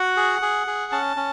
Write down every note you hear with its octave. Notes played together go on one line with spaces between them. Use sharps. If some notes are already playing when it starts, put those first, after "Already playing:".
Already playing: F#4 F#5
G#4
G#4
G#4
C#4 A5
C#4